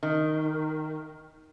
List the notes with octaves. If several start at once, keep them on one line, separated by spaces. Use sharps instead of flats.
D#3